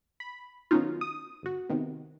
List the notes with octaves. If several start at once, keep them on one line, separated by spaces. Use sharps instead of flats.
B5
D#3 F#3 B3 C#4 D#4 F4
D#6
G1 F#4
C3 D#3 B3